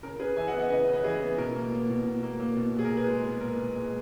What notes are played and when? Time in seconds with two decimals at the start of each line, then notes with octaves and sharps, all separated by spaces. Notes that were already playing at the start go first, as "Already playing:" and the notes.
0.03 C#3 A#4
0.19 C#3 G#4 B4
0.36 E3 E5 G#5
0.48 D#5 F#5
0.53 B3
0.59 D#5 F#5
0.70 C#3 B4 D#5
0.88 C#3
0.93 B4 D#5
1.04 E3 G#4
1.21 B3
1.38 B2 A#4
1.55 A#3
1.72 A#3
1.89 B2
2.06 B2
2.23 A#3
2.40 A#3
2.57 B2
2.74 A#2 G#4
2.85 A#4
2.91 A#2
2.97 G#4 B4
3.08 G#3
3.25 B3
3.41 A#2 A#4
3.58 A#2
3.76 G#3